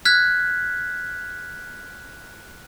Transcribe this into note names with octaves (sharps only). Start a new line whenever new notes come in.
F6 F#6 G#6 B6